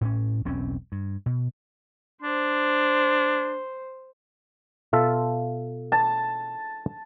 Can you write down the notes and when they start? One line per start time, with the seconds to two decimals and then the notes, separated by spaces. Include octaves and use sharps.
0.01 A2 C#4
0.45 E1 B1 C4 C#4
0.92 G2
1.26 B2
2.22 D4 C5
4.93 B2 F4 A4 E5
5.92 A5